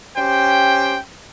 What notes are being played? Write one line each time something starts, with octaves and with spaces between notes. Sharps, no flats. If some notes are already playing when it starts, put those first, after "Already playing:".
C#4 G4 C5 G5